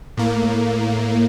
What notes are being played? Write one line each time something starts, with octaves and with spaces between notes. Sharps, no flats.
A2 A#3